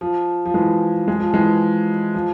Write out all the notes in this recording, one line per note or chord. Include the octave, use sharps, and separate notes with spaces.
F3
F3
E3 G#3
G#3
F3
E3 G#3
F3